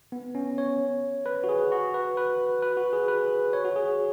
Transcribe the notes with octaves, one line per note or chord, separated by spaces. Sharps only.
B3
C#4
C#5
B4
F#4
G#4
F#4
B4
B4
B4
F#4
G#4
B4
C#5
F#4
G#4